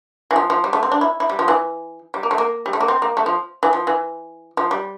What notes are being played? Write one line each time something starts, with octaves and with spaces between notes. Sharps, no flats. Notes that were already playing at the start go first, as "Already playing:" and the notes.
E3
F3
F3
G3
A3
C4
D4
E4
E4
G3
F3
E3
G3
A#3
A3
A#3
G3
A3
A#3
C4
A#3
A3
F3
E3
F3
E3
F3
G3